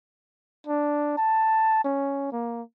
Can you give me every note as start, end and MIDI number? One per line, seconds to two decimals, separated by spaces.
0.67 1.15 62
1.18 1.84 81
1.85 2.28 61
2.32 2.62 58